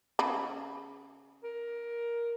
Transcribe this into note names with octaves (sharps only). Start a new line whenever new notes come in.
C#3 B5
A#4